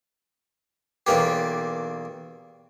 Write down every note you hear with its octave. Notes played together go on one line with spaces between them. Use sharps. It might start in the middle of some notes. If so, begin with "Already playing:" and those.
B1 E2 A#3 G4